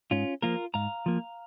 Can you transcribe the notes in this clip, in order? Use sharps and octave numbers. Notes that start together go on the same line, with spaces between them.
G#2 C#4 F4
F3 A#3 F4 A#4
G#2 F5 A#5
F3 A#3